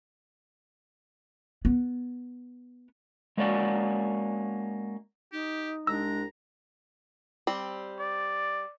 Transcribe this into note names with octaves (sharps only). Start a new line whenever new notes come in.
B3
G#3 A#3 C#4 F#4 D5 F#5
D#4 G4
C2 G#3 D4 A#5 E6
G3 C4
D5